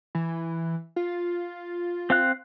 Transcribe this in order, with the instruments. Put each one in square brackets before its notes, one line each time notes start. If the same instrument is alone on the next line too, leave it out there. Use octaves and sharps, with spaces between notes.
[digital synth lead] E3
F4
[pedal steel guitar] C4 F5 F#6